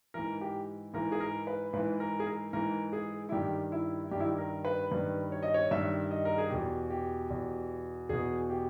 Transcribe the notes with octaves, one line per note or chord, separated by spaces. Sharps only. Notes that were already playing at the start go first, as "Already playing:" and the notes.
G#2 E3 A#4
G4
G#2 E3 A#4
G#4
A#4
B4
G#2 E3 B4
A#4
G#4
A#4
G#2 E3 A#4
G#4
E4
G2 D#3 G4
E4
G2 D#3 G4
E4
G4
A#4
B4
G2 D#3 B4
C#5
D#5
C#5
G2 D#3 E5
D#5
A#4
G#4
E2 B2 G4
G4
E2 B2
E2 B2 G#4
G4